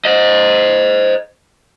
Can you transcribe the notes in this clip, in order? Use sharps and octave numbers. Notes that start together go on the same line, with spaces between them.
C5 D#5